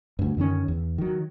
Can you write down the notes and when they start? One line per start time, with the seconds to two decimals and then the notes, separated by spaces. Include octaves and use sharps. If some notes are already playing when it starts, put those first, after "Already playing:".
0.19 D2 G2
0.37 F#2 D3 D#3 C#4
0.68 E2
0.98 D#3 F#3